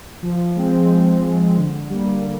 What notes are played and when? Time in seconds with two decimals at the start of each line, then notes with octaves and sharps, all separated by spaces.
0.23 F3
0.56 G#3 C4
0.90 F3
1.24 G#3 C4
1.57 D3
1.90 G3 A#3
2.24 D3